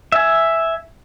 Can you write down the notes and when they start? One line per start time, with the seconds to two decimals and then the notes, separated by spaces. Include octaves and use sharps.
0.12 E5 G#5